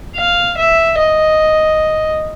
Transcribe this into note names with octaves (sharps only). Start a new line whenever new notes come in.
F5
E5
D#5